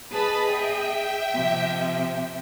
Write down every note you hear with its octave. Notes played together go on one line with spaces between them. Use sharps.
G#4 B4 D#5 A5 B5
E5 G5
C3 F3